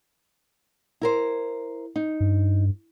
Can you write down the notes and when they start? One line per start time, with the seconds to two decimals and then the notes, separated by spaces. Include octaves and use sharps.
1.01 E4 A#4 C5
1.96 D#4
2.20 G2